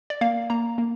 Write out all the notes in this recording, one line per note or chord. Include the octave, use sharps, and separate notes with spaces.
D5
A#3 F5
A#3 A#5
A#3